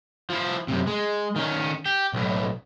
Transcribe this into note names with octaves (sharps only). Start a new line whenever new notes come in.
F3 E4
F#2 C3
G#3
D#3 C#4
G4
B1 A2